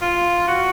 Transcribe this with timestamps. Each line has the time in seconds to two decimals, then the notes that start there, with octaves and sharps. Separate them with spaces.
0.02 F4
0.48 F#4